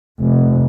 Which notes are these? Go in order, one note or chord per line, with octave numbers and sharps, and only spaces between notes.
F1